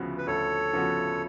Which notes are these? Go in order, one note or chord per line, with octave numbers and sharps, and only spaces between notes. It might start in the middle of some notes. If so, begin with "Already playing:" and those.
Already playing: D2 C#3 F3 B3 F#4
B4
D2 A4 C#5
C#3 F3 B3 F#4